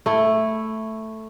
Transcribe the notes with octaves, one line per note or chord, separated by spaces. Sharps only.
A3 E4